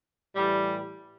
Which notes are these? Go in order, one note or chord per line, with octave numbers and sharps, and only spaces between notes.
A2 E3 G3